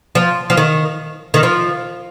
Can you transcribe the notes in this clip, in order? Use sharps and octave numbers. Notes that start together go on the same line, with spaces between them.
F3
F3
D#3
D#3
F3